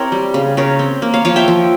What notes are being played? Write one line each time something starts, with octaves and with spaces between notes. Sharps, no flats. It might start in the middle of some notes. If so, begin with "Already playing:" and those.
Already playing: C4 E4 G4 A#4 C#5
G3
C#3
C#3 A#4 C#5
C4
A#3
C#5 F5
F3 C#5 F5
E5 G5
F3